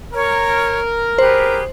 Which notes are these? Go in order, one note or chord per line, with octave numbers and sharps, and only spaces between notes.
A#4 C#5
G4 G#4 B4 C5